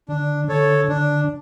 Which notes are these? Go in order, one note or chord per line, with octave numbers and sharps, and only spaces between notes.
D3 D4
D3 A4 C#5
D3 D4